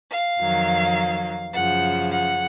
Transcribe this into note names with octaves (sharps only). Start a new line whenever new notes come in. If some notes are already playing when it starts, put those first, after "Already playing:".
F5
F2 D#3 F#3
F#2 C#3 F3 F#5
F#5